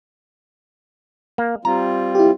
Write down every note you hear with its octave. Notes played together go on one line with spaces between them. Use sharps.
A#3
G3 C4 F4 A#5
E4 G4